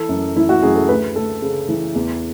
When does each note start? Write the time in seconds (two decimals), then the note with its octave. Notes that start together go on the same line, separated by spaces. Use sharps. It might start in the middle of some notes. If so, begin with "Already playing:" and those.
Already playing: E3 A4
0.09 F#2
0.36 E3 E4
0.49 F#4
0.62 F#2 G#4
0.76 A4
0.89 D2 B4
1.15 D2 A4
1.42 C#3
1.69 E3
1.95 E2